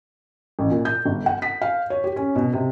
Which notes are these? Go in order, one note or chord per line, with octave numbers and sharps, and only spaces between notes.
A1
A#2
G6
G1
F#5
B6
F5
C#5
G4
C#4
B2
C3